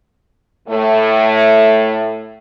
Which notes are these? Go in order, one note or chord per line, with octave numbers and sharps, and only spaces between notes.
A2 A3